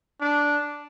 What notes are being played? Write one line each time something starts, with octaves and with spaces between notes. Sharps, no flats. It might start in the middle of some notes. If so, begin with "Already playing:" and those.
D4